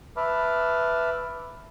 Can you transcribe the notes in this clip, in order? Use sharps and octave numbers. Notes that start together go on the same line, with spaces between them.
B4 E5 A5 B5 D6 F6